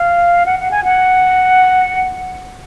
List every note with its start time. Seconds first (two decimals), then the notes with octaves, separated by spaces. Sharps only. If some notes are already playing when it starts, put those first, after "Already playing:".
Already playing: F5
0.46 F#5
0.60 F#5
0.71 G#5
0.84 F#5